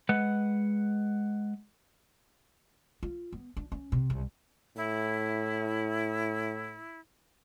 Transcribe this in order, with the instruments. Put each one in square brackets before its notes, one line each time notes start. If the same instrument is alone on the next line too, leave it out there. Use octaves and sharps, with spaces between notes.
[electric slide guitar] G#3 B4 F#5
[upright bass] F4
B3
D4
C#4
C3
C2
[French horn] A2 [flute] E4